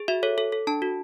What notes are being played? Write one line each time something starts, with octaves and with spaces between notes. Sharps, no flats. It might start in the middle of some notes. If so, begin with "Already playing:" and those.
Already playing: G#4
F#4 E5
A4 C#5
A4
A4
D4 A5
F#4